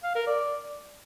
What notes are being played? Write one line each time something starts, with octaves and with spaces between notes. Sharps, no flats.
F5
A#4
D5